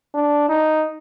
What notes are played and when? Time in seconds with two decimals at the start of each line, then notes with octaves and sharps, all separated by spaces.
0.14 D4
0.49 D#4